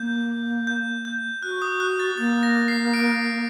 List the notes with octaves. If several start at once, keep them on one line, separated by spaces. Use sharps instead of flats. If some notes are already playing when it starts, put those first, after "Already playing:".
Already playing: A#3 G6
G6
G6
F#4 F#6
D#6
F#6
A6
A#3 A6
A#6
C7
D7